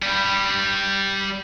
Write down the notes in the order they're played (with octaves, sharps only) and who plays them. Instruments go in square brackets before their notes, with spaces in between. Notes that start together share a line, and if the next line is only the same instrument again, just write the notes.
[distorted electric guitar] G3 B4